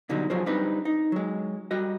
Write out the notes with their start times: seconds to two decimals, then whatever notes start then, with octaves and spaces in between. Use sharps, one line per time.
0.09 B2 D3 F#3 G3 D#4
0.30 F#2 F3 F#3 F4 G#4 C5
0.46 G3 C4 D4 D#4 B4
0.85 D#4
1.12 F#3 G#3
1.71 G3 F#4 D#5